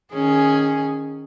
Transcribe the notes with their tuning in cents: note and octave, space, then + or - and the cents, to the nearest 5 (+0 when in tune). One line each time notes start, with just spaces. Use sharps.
D#3 -15 C#4 +0 G#4 +0